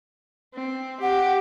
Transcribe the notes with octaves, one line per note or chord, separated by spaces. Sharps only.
C4
G4 F#5